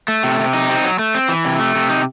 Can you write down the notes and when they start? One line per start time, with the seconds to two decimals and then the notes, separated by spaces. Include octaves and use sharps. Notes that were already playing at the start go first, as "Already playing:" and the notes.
0.08 A3
0.24 C3
0.39 C3
0.53 D#4
0.69 C4
0.84 F#3
0.99 A3
1.15 C4
1.29 E3
1.45 C3
1.60 A3
1.75 C3
1.89 D#4